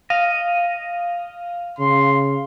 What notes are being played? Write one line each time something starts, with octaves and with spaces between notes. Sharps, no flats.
D#5 F5
C#3 C6